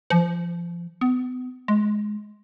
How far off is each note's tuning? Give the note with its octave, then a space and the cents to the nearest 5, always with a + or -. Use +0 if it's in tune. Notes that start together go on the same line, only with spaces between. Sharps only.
F3 -25
B3 +35
G#3 +15